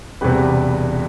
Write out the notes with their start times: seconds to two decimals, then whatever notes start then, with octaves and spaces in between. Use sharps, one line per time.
0.21 E1 E2 C3 G3 G4 B4